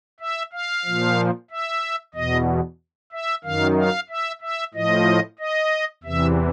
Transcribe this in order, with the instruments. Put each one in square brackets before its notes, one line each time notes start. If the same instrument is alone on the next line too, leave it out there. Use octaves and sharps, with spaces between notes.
[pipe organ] E5
F5
A#2 F3
E5
E2 B2 D#5
E5
F#2 D#3 F5
F5
E5
E5
A2 F3 D#5
D#5
E2 C3 E3 E5